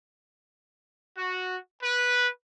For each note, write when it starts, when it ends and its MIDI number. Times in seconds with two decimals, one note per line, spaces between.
1.18 1.58 66
1.83 2.29 71